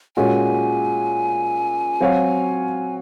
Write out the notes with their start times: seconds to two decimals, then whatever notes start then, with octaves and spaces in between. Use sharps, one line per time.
0.17 A#2 G#3 C#4 F#4 G#5
2.00 F#3 C4 F#4 C#5 F5